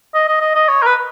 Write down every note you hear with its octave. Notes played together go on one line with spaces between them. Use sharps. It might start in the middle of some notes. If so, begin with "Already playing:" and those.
D#5
D#5
D#5
D#5
C#5
A#4
B4